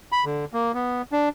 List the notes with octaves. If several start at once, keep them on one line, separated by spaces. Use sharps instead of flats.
B5
D3
A#3
B3
D4